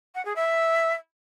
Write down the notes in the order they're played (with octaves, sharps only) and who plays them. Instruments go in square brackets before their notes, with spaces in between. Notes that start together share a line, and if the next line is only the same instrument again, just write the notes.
[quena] F#5
G#4
E5